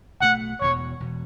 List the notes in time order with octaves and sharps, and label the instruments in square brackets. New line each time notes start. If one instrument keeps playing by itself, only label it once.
[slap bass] B1 B2 F#3 A3 [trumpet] F#5
[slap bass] E1 E2 B2 [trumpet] C#5
[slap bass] E1 B2